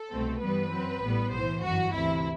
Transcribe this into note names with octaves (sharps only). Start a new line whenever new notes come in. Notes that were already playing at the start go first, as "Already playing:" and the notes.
Already playing: A4
C2 B2 A3 C4
G2 E3 G3 B3 B4
F#2 F#3 C4
A1 A2 G3 B3
B1 A2 E3 C5
G1 F#2 E3 F#4
D2 C3 E3 E4